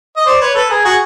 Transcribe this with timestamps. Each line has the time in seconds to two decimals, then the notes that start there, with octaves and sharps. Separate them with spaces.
0.17 D#5
0.26 C5 D5
0.41 B4 C#5
0.55 A4 B4
0.70 G#4 A#4
0.85 F#4 G#4